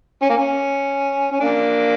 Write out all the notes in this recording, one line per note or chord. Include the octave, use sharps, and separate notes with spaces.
C#4
A#3
C#4
C#4
A#3 D4